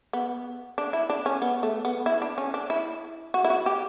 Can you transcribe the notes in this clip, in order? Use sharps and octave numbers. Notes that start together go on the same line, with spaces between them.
B3
D4
E4
D4
C#4
B3
A3
B3
E4
D4
C#4
D4
E4
F#4
E4
F#4
G4